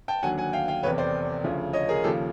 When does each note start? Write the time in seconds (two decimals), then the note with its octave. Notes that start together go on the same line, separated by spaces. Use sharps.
0.08 G5 A5
0.23 D#2 D3 F#3 F#5 G#5
0.38 F#5 G#5
0.53 F5 G5
0.68 F5 G5
0.83 F1 E2 C3 B4 C#5
0.98 C5 D5
1.44 D2 C#3 F3
1.73 C#5 D#5
1.89 G#4 A#4
2.04 D#2 C#3 F3 G4 A4